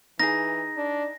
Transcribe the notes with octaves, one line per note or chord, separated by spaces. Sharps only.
E3 D#4 G#4 A#6
D4